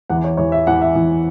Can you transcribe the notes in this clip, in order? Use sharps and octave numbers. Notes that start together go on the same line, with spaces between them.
E2 E3 F#5
C#5
E2 E3 C#5
E5
E2 E3 F#5
E5
E2 E3